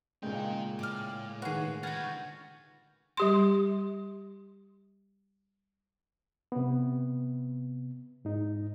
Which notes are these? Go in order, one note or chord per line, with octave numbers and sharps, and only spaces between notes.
A#2 C#3 G#3 D#4 A#4 G5
A2 D6 F6
D#3 F#4 G#4 B4
D3 F#4 B4 G5 F6 G#6 A6
G3 G4 C6
C3 B3
G#2 D#4